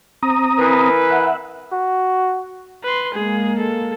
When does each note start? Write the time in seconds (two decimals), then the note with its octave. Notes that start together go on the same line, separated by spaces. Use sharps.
0.23 C4 A#5 D#6
0.58 E3 A#4 B4
1.10 E5 F#5
1.72 F#4
2.84 B4 C6
3.14 G#3 A#3 G#4
3.58 A4